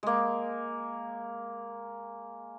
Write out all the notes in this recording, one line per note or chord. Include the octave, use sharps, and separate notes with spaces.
G#3 A#3